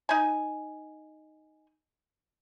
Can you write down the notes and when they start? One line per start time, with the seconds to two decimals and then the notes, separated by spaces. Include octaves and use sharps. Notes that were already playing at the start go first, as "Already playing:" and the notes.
0.09 D#4 G#5